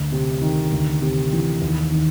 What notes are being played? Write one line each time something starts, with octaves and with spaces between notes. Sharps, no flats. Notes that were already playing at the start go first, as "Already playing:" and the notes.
Already playing: D2
C3
D#3
D2
C3
E3
D#2
D#3